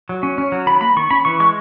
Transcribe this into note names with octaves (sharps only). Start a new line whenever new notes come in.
F#3
C#4
C#4
F#3
D#3 B5
A#3 B5
D#3 C#6
C#4 B5
E3 C#6
G#3 C#6